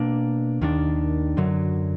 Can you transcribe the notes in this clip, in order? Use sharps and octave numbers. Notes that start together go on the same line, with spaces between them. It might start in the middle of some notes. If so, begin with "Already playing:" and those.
Already playing: B2 A#3 D4
D#2 D#3 F#3 D4
F#2 D3 F#3